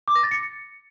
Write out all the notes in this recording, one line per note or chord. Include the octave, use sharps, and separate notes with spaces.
D6
A#6
A6
C#7